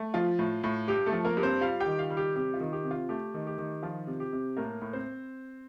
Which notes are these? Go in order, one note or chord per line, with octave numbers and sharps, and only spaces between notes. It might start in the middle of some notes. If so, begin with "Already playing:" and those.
Already playing: A3
F3 F4
A2
A2
G2 G4
A3 A4
F3
A#3 A#4
G2
C4 C5
G3 F4 F5
G4 G5
D#3
F4 F5
G3
G4
C3 G4
F4
D#3
G4
C3
F4
A3 G4
D#3
G4
D#3
F3 F4
C3
G4
C3
A2 A#3 A#4
A2
C4 C5